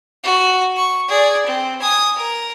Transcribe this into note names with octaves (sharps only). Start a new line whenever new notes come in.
F#4
C#6
G#4 D5
C4
G#5 D#6
A#4